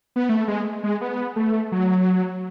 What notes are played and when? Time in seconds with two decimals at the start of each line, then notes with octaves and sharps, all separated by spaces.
0.16 B3
0.29 A3
0.48 G#3
0.84 G#3
1.01 B3
1.36 A3
1.72 F#3